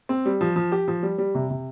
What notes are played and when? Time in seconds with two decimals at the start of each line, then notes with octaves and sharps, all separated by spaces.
0.09 C4
0.26 G3
0.41 F3
0.56 F3
0.72 G4
0.88 F3
1.03 G3
1.18 G3
1.35 C3
1.50 C3